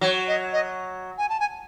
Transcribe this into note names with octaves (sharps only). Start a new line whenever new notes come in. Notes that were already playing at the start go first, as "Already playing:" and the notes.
F#3 C#5
D#5
D#5
G#5
A5
G#5